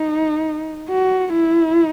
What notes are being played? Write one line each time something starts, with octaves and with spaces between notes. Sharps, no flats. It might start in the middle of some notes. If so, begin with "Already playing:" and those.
Already playing: D#4
F#4
E4